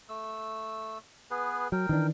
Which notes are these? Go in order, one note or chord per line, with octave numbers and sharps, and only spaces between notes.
A3 E6
B3 G#4 B4
F#3 A#4 G5
D#3 E3 D4